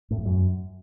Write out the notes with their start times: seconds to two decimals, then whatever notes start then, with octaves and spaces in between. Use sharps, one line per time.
0.11 A2
0.18 E2
0.25 F#2